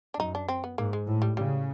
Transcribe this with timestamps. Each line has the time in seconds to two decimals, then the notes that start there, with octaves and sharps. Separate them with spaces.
0.14 D4
0.19 F#2 D#4
0.35 D4
0.48 C4
0.64 B3
0.78 G#2 A#3
0.93 G#3
1.07 A2
1.22 G3
1.37 C#3 G3